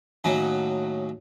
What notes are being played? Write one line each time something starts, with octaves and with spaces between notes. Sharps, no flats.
D#2 A2 F#3 C#4 D#4